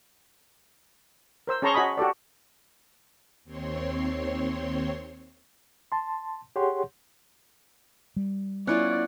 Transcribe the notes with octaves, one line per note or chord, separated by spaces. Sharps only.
A#4 C5 E6
C#4 G#4 A5 A#5 C6 C#6
F#4 D#5 G#5 B5 D#6
F#4 G4 A4 D5
D#2 C4 C#5 C6
A5 C6
G4 G#4 C#5 F#5 C6
G3
B3 C#4 E4 F4 D5 F#6 C#7